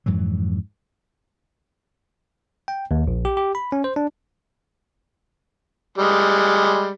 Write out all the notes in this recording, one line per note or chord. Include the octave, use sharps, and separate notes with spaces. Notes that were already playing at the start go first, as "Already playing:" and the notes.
F2 G#2 E3 F#3
G5
D#2
A#1
G4
G4
B5
C#4
C5
D4
G3 G#3